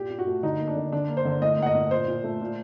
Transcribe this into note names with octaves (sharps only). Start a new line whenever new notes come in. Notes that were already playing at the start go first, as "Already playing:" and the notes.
Already playing: A#2 G4
A#2
F#4
A3
D3 D#4
A#3
D4
D3
D3 D4
A#3
C5
D3
A2 D#5
A#3 F#5
D#5
A2
A#2 C5
A#2
A3
A#2